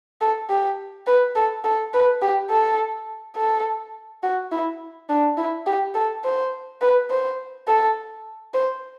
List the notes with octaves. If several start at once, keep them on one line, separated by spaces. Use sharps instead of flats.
A4
G4
B4
A4
A4
B4
G4
A4
A4
F#4
E4
D4
E4
G4
A4
C5
B4
C5
A4
C5